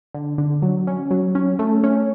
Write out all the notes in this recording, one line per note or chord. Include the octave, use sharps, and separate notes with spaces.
D3
D3
F#3
C#4
F#3
C#4
A3
C#4